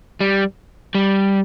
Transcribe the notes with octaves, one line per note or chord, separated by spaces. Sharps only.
G3
G3